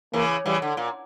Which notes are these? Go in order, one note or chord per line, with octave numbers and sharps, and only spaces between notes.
C#3 E3 A#3
C#3 E3 G3
D3
A#2